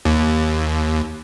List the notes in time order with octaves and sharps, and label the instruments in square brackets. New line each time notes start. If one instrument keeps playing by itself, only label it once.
[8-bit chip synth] D#2